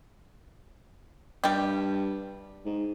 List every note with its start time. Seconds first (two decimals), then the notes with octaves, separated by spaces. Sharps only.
1.44 G2 G3 G4
2.65 G#2